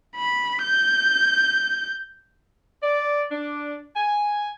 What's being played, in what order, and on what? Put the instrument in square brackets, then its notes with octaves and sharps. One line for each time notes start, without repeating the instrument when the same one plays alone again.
[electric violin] B5
G6
[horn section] D5
D4
G#5